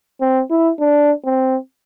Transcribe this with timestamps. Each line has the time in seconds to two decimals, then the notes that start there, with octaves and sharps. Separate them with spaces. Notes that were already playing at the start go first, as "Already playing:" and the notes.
0.21 C4
0.50 E4
0.80 D4
1.25 C4